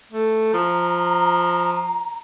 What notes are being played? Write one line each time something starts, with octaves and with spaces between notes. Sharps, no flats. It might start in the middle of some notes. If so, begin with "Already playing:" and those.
A3
F3 A#5